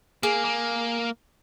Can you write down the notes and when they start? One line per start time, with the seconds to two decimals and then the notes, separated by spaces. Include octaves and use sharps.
0.23 A#3 G#4
0.45 A#3